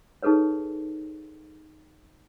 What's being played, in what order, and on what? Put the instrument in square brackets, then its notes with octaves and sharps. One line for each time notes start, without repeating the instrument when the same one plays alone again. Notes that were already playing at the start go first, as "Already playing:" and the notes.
[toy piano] D#4 G#4 A4 B4 C#5